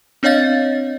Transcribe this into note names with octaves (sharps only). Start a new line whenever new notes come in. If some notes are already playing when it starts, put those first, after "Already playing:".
C4 D4 C#5 D#5 F5 A6